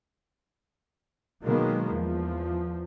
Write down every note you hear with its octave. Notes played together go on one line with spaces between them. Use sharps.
B2 D#3 F#3 G#3 A#3 B3
E2 F3